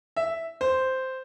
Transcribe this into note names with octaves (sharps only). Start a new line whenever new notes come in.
E5
C5